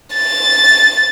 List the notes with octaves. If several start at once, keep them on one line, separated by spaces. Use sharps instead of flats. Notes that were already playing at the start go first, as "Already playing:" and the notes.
A6